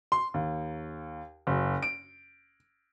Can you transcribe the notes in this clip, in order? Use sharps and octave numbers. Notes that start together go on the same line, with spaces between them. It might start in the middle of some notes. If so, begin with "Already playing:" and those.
C6
D#2
F#1
D7